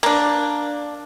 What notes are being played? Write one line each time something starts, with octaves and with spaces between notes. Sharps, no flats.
A#3 D4